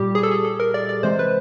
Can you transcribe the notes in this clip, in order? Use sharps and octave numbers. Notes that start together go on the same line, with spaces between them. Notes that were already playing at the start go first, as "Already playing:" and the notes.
Already playing: A#2 G3 G4
G#4
A4
G#4
A4
A#4
D5
D5
C3 E3 G#3 C5
B4